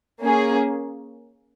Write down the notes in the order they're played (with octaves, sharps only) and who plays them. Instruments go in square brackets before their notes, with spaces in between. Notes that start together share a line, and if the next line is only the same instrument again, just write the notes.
[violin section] A#3 C#4 G#4